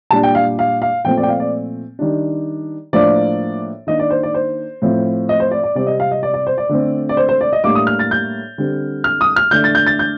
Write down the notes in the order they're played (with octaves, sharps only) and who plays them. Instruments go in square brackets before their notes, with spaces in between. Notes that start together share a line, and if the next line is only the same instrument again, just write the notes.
[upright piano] A#2 G3 D4 A5
G5
F5
F5
F5
A#2 F3 A3 C4 G5
D5
G5
F5
D5
D#3 G3 D4
A2 F3 A#3 D4 D5
D#3 A#3 D4 D#5
D5
C5
D5
C5
A2 F3 C4
D#5
C5
D5
D5
C3 G3 C4 D5
D#5
F5
D#5
D5
D5
C5
D5
D3 A3 C4
D5
C5
C5
D5
D#5
A2 G3 A#3 D4 D6
D#6
F6
A6
G6
D3 G3 C4
F6
D#6
F6
D3 A3 D4 G6
A6
G6
A6
G6